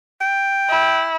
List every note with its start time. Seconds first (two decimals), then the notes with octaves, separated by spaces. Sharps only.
0.21 G5
0.69 E4